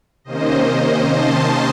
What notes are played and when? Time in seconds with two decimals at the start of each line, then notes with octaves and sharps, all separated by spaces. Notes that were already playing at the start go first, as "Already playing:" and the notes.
0.24 C3 D#3 A#3 C#4 C5 D#5
1.13 A5 C6